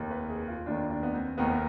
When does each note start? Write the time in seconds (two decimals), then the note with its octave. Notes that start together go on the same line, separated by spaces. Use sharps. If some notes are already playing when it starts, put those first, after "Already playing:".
Already playing: F1 D#2 D#3
0.11 B4
0.29 G#4
0.48 F4
0.66 F1 D#2 D#3 D4
0.90 D4
1.03 B3
1.14 C4
1.38 F1 D#2 D#3 B3